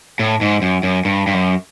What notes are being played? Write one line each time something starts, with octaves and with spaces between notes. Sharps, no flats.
A2
G#2
F#2
F#2
G2
G2
F#2